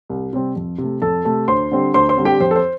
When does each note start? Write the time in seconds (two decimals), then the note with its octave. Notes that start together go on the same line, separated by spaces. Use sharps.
0.09 C2
0.33 C3 G3 C4
0.56 F2
0.78 C3 A3
1.02 F2 A4 A5
1.25 C3 A3
1.48 D2 C5 C6
1.72 D3 G3 C4
1.94 D2 C5 C6
2.09 C5 C6
2.17 D3 G3 C4
2.25 G4 G5
2.40 F2 C5
2.51 A4
2.56 C5